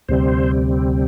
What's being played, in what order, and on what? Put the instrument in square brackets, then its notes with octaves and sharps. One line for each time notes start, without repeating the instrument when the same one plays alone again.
[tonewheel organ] D2 C3 G3 C4 C5